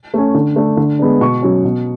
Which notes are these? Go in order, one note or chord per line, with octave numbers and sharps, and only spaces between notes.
A3 C#4
D3
A3 D4
D3
G#3 B3 D4
B2 C#6
F#3 C#4
B2